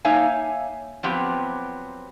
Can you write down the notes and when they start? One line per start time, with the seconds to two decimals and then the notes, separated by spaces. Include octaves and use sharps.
0.05 A#3 D#4 C#5 E5 F5 G#5
1.03 F3 F#3 B3 C4 G4